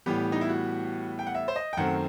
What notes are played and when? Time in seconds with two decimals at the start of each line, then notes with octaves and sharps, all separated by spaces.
0.06 A2 E3 G3 B3 G4
0.32 D#4
0.41 E4
0.49 F#4
1.19 G5
1.27 F#5
1.35 E5
1.48 C5
1.56 D#5
1.73 G5
1.77 F#2 D#3 A3 C4 F#5